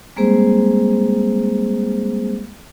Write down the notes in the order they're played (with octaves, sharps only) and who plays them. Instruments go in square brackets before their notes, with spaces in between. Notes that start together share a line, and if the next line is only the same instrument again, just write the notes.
[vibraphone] G3 G#3 A#3 C4 G#4 C5